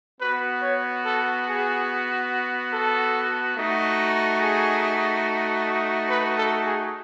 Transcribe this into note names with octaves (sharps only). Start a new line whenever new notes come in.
B3 F#4 B4
C#5
A4
G#4
A4
A3 D#4 F#4
G#4
B4
A4
G#4